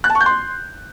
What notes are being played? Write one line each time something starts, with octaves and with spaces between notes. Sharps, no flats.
F#6
A5
C#6
G6
C6